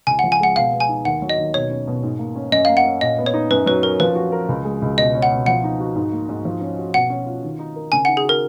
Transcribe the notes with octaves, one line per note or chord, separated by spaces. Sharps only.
C#2 G#5
F3 F#5
G#5
G#3 F#5
B2 F5
B3
G#5
D#4
D#2 F#5
F#3
D#5
D#2
B2 C#5
C#4
B2
G#2
A#3
C#4
F#2 D#5
A#3 F5
F#5
C#4
A#2 D#5
B3
C#5
D#4
F#2 B4
F#3 B4
C#4 A#4
F3 B4
F#4
A#4
C#2
G#3
C#2
B2 D#5
C#4
F#5
B2
F3 F#5
D#4
F#4
G#2
A#3
G#2
F3
C#4
F#4
B2 F#5
C#4
F4
D#3
D#4
A#4
C#3 G#5
D#4 F#5
G#4
F#4 A#4